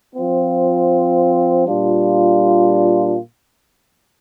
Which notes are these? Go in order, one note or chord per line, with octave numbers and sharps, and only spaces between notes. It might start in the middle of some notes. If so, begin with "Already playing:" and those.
F3 C4 F4
A#2 G3 D4 F4